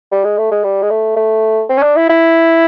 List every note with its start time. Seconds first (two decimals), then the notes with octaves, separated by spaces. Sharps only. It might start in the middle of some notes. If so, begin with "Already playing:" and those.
0.12 G3
0.24 G#3
0.38 A3
0.51 G#3
0.64 G3
0.82 G#3
0.91 A3
1.16 A3
1.69 C4
1.78 C#4
1.83 D4
1.96 E4
2.09 E4